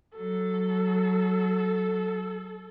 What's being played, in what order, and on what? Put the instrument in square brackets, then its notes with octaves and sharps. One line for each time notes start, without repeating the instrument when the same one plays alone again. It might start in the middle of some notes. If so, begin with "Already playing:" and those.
[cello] F#3 [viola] A4